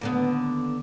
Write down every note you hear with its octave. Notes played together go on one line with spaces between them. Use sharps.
D#2 D3 B3